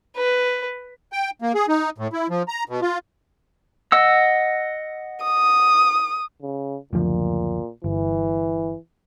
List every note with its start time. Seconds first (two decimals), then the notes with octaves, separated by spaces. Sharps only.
0.17 B4
1.12 G5
1.42 A#3
1.54 G#4
1.68 D#4
1.98 A2
2.13 E4
2.30 F3
2.48 A#5
2.69 B2
2.82 F4
3.92 D#5 F#5 E6
5.24 D#6
6.42 C#3
6.93 F#1 D2 A#2 F3
7.84 G1 E3